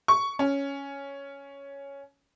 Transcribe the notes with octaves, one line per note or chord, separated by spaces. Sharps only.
C#6
C#4